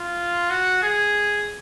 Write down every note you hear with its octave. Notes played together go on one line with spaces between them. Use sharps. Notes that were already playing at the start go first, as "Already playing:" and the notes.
Already playing: F4
F#4
G#4